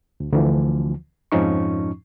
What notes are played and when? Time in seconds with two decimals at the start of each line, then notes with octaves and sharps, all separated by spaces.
0.20 D2
0.32 D2 D3 E3 F3
1.32 F2 G#2 F3 C#4 D#4 C#6